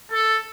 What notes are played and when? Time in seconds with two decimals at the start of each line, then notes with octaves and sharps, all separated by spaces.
0.11 A4